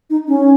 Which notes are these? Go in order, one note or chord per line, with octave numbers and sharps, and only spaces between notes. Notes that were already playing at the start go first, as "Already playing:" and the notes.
D#4
C#4